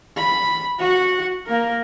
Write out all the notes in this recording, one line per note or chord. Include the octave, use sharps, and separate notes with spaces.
B5
F#4 F#5
A#3 A#4